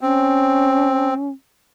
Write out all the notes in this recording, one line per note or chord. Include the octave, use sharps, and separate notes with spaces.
C4 C#4